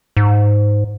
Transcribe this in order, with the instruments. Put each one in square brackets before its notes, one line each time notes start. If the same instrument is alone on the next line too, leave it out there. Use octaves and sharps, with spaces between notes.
[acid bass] G#2